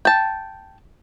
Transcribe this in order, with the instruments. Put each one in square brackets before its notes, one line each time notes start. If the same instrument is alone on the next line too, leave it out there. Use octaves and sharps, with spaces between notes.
[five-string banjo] G5 A5